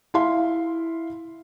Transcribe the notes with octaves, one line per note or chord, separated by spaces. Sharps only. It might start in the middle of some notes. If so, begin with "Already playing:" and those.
E4 F5 C6